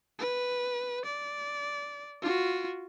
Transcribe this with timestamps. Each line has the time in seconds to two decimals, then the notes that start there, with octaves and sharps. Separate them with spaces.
0.19 B4
1.05 D5
2.22 F4 F#4